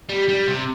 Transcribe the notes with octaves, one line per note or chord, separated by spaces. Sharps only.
G3
G3
C3